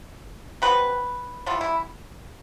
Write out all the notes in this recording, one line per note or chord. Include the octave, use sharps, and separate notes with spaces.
C3 G3 B3 B4
E3 G3 B3 F4
E4